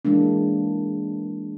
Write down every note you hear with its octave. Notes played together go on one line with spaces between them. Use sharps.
E3 G#3 A#3 D4